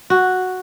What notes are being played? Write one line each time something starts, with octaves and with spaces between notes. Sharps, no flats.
F#4